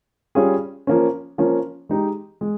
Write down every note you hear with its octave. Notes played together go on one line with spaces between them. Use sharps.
G3 C#4 F4 G#4
F3 A#3 C#4
F3 A#3 C#4
G#3 D#4 G4
G#3